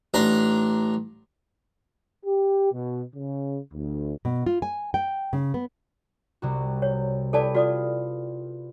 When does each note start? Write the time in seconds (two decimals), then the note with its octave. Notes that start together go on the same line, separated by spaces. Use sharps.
0.14 A1 D4 A#5
2.25 G4
2.72 B2
3.15 C#3
3.73 D2
4.25 B2
4.46 F4
4.62 G#5
4.94 G5
5.33 C#3
5.54 B3
6.42 C2 C3 F#4
6.82 C#5
7.33 E4 G4 A4 B4 D5 A5
7.54 F4 F#4 D5 D#6